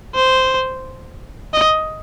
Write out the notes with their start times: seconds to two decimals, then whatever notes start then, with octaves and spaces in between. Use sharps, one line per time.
0.15 C5
1.54 D#5